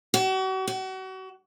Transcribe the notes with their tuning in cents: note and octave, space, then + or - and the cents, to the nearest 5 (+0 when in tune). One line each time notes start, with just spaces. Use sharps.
F#4 +40
F#4 +35